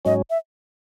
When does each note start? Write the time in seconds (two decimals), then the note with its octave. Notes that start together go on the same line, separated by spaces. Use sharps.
0.05 G#2 F#3 C#4 D#5
0.30 E5